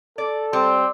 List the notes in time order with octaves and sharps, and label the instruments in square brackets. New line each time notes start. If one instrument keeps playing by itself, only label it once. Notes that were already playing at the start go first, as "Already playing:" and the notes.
[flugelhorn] A4 [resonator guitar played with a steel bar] D5
[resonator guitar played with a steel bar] G3 [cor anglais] C4